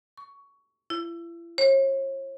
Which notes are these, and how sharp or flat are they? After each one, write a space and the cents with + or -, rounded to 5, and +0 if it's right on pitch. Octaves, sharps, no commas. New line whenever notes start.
C#6 +15
E4 +40
C#5 -40